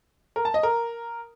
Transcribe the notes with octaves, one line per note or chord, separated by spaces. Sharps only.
A#4
A5
D#5
A#4